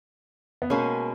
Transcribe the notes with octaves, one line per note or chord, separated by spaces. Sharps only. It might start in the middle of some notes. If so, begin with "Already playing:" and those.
B3
B2 G#3 A#3 C#4